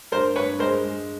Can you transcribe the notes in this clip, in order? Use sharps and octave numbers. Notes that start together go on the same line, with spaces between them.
G2 A#4 C5
G2 B4 C#5
G#3 A#4 C5
G#3